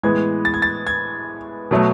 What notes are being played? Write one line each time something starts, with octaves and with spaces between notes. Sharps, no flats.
A2 E3 G#3 B3 G#6
A6
G#6
A6
G#6
B2 F#3 A3